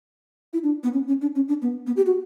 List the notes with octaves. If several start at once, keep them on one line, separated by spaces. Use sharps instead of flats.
E4
D4
B3
C#4
C#4
D4
C#4
D4
B3
B3
G4
F#4